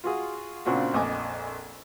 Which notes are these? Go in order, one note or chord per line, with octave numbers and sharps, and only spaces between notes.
F4 F#4 G#4
A#2 C#3 C4 D4 F4 F#4
A#1 F2 D#5 G#5 D6